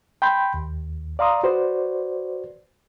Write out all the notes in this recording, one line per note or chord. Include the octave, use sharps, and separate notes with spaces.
G5 B5 C6 G6
D#2
D5 F5 A#5 C6 D#6
F#4 B4 C5 D5